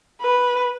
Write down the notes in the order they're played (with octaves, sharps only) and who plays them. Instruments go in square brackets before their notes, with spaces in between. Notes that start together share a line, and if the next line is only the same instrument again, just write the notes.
[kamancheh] B4